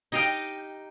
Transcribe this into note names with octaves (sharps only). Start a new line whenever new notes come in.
D#4 G4 D#5 F5 G5